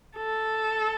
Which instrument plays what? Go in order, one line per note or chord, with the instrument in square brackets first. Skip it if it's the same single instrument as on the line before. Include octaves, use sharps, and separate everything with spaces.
[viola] A4